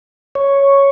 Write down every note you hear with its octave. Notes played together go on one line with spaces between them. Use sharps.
C#5